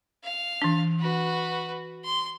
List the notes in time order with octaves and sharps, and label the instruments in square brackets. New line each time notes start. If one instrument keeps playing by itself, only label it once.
[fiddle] F5
[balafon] E3 D4
[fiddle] F#4 B4
C6